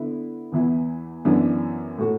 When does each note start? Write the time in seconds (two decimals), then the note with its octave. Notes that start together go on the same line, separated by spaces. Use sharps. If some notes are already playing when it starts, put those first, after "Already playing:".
Already playing: D3 B3 E4
0.52 E2 E3 B3 E4
1.25 F#2 E3 B3 D4
1.98 A2 A3 F#4